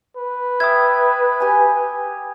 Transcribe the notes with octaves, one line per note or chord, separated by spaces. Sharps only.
B4
E5 G5 D#6 G#6
G4 G#5